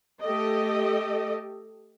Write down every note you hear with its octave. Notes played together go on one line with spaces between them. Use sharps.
A3 G4 A4 D#5